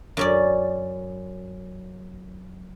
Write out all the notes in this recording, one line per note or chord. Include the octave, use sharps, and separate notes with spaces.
F#2 C#4 D5